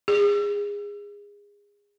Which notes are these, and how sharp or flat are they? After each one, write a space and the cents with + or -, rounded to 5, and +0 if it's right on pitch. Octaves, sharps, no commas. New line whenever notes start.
G#4 -25